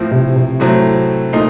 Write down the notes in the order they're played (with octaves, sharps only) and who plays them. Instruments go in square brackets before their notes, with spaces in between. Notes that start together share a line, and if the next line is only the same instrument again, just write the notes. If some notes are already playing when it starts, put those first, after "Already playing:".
Already playing: [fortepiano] A2 F3 C4
[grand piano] C3
C3
[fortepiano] A2 F#3 A3 C4
A#2 A3 D#4